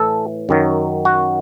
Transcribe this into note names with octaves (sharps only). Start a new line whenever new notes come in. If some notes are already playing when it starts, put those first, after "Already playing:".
Already playing: A2 E3 A4
F#2 D#3 F#3
F#4